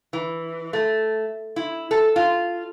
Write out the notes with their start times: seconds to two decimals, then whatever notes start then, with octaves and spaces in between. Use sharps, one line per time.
0.13 E3
0.73 A3
1.56 E4
1.91 A4
2.16 F4